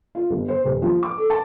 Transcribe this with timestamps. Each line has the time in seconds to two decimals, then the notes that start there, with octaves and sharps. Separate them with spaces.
0.15 F4
0.30 G1
0.48 C5
0.64 D#1
0.82 F3
1.03 D6
1.17 A4
1.30 A5